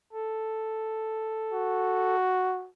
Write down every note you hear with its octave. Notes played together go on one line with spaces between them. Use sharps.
A4
F#4